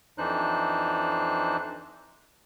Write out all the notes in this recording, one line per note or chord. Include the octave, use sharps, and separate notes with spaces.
F2 E3 D4 D#4 C5 F#6